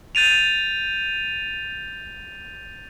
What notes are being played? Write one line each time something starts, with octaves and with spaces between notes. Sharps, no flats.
G6 A6 D#7 F7